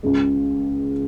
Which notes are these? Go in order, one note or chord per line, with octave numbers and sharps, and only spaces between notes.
C#2 C#3 G#3